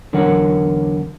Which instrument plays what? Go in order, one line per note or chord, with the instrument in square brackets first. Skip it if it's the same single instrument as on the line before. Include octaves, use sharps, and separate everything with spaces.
[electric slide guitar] E2 D3 F#3 A#4 C#5 F#5